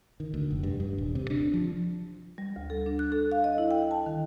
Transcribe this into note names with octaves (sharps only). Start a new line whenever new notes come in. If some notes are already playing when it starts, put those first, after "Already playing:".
D#3
D2
F1
G2
G2
D#1
C3
D4
F3
G3
D2
A4
D4
F#6
A4
F5
D#5
E4
G5
A5
D#3